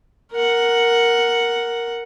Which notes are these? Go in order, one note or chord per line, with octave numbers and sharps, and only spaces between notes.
A#4 F#5